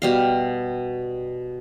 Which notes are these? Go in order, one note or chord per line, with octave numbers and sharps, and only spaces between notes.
B2 G3 F5